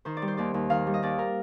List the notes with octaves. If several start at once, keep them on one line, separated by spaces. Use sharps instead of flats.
D#3 C5
D5
G3
C5
D#2 D5
D#2
D#3 F5
G3
D#5
D#2 D5
A#4